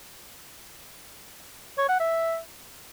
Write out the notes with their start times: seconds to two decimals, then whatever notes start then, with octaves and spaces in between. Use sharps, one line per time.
1.78 C#5
1.89 F#5
2.00 E5